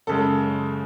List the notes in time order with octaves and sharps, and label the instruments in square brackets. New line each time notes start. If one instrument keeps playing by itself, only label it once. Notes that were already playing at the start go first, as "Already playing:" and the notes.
[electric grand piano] F#2 C#3 G#3 [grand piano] A4